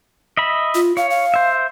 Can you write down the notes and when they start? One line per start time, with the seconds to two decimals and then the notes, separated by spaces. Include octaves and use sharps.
0.37 D#5 E5 B5
0.75 F4
0.97 C#5 F5
1.10 F5
1.34 C5 E5